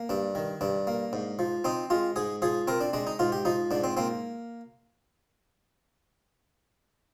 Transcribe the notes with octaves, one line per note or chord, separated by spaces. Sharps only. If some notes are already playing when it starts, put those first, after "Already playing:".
Already playing: A#3
G2 D4
D#3
G2 D4
A#3
G#2
F3
C4 D#4
G#3 F4
G#2 G#4
F3 G#4
C4 A#4
D4
G#3 D4
D#4
G#2 F4
G4
F3 D#4
G#2 D4
C4
A#3 C4